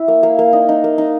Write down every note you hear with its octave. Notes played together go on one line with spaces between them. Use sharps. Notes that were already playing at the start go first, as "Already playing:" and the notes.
Already playing: E4
A#3
A#3
A#3
D#4
D#4
A#3
D#4